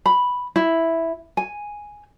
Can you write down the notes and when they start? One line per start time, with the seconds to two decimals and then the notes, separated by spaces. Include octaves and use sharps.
0.06 B5
0.56 E4
1.37 G#5